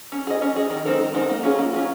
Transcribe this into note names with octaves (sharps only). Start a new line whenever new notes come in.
C#4
G#4 D#5
C#4
G#4 D#5
D#3
G#3 C4 D#4 A#4
D#3
G#3 C4 D#4 A#4
A#3
C#4 F4 G#4
A#3
C#4 F4 G#4